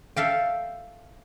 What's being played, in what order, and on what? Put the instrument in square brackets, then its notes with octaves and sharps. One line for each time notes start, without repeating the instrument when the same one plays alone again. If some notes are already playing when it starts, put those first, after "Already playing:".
[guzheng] A4 E5 F5 G5